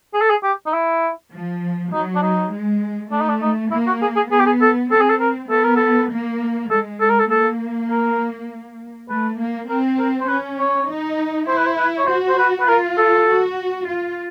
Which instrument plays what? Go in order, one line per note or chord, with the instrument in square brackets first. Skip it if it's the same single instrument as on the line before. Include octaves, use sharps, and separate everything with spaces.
[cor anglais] G#4
A4
G#4
G4
D#4
E4
[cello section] F3
[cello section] F#3 [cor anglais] D#4
[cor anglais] D4
D#4
[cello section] G#3
[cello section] A3 [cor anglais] D4
[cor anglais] D#4
D4
D#4
[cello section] A#3 [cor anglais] E4
[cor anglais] F#4
G#4
G#4
[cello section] B3 [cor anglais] G#4
[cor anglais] G4
G#4
A4
[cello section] C4 [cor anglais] A4
[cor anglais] G#4
A4
A#4
[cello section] B3 [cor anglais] A4
[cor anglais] A#4
A4
[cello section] A#3
[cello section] G#3 [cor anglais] A4
[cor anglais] A4
A#4
A4
[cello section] A#3 [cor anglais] A4
[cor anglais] A#4
[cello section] A3 [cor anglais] B4
[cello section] A#3
[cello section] C4 [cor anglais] A#4
[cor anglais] A#4
C5
[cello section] C#4 [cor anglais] B4
[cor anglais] C#5
[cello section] D#4
[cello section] E4 [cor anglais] C5
[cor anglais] B4
C5
B4
C#5
[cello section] F#4 [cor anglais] C5
[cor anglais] C5
B4
B4
[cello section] F4 [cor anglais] A#4
[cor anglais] A4
[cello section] F#4
F4